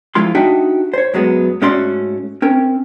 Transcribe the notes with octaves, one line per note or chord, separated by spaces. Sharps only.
F3 G#3 E4 F4 C6
D4 D#4 F#4 G4 D#5 E5
C5 C#5
F#2 F#3 G#3 B3
G#2 A3 C#4 F#4 D5 C6
C4 C#4 A#4